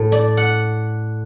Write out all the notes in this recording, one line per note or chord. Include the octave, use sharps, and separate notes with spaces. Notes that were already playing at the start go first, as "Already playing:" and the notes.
Already playing: A2
D5
F#5